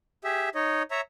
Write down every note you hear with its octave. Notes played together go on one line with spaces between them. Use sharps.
G4 G#4 E5
D#4 C#5 D#5
C#5 E5 A#5